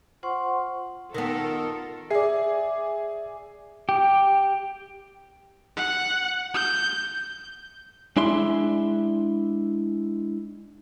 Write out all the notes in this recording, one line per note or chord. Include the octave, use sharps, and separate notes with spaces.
F4 C5 F#5 C6 C#6
D#3 B3 F4 A4 A#4
G#4 D5 E5 C7
G4
F#5
G6
G#3 D4 E4 E5 C6